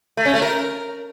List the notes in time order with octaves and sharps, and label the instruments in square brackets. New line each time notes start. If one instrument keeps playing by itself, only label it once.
[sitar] A3
C#4
A3
A#4